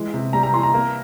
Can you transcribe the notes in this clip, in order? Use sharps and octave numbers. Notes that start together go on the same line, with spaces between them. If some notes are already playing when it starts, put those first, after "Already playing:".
Already playing: E3 G#3
C3
G3 A#5
A#5
E3 C6
A#5
A#3